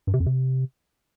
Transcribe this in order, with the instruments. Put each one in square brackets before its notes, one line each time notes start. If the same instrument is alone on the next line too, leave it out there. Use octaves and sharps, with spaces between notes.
[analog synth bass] G2
C3
F2
C3